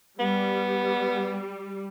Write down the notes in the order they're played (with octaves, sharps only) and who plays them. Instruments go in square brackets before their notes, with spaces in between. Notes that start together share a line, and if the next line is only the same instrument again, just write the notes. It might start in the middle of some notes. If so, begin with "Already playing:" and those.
[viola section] G3 [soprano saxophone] B3